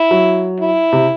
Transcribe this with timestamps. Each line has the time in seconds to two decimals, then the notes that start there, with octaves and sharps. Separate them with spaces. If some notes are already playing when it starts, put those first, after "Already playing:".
Already playing: E4
0.11 F#3
0.60 E4
0.93 C3